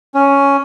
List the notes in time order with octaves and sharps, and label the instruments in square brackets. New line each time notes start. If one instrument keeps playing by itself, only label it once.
[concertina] C#4